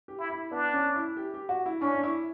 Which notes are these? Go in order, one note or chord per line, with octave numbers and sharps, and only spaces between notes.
G4
E4
E4
B3 D4
C#4
E4
G4
G4
F#4
E4
C#4 D4
D4
E4